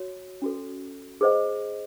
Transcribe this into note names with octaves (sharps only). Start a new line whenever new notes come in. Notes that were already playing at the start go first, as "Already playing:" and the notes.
Already playing: F#4 C#5
C#4 F#4 A4
G#4 C5 D#5 F#5